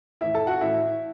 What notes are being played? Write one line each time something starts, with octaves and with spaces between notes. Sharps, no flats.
A2 E3 E4 E5
A4 A5
F#4 F#5
A2 E3 E4 E5